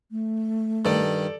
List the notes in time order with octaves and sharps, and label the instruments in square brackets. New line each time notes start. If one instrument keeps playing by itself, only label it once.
[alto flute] A3
[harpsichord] G2 D#3 [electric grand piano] A4 D5